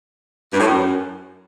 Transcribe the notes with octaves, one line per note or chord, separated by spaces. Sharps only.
G2
A2
F#2